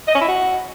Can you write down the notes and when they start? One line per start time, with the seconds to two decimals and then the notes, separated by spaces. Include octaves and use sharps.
0.08 D#5
0.15 C#4
0.21 E4
0.28 F#4